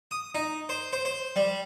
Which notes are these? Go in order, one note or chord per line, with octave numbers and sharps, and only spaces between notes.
D#6
D#4
C5
C5
C5
G3